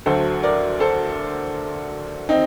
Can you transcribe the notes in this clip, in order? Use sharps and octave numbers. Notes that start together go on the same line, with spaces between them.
D2 D3 F#3 A4 C5
A#4 D5
A4 C5
C4 D#4